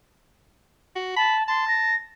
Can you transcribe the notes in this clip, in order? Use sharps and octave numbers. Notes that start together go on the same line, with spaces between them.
F#4
A5 B5
A5 C6
A#6